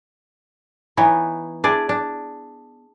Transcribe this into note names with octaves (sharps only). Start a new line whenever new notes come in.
E3 B3 D#4 C#5
D4 E4 G#4 D5
D4